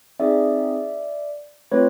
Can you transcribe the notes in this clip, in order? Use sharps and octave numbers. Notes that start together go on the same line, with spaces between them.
C4 D#4 G#4 D5 E5
A3 C4 F4 B4 C#5